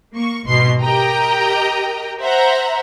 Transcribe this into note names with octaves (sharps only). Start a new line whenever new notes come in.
A#3 C#6
G#1 B2 C6 C7
G4 A#4 D#5 G5 A#5
C5 E5 F#5 A#5